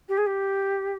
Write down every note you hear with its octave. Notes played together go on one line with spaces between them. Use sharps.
G4
G#4
G4